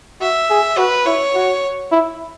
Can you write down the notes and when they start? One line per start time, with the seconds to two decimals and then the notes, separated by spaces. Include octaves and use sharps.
0.21 F#4 E5
0.50 G#4
0.77 F#4 B4
1.06 E4 C#5
1.35 F#4
1.92 E4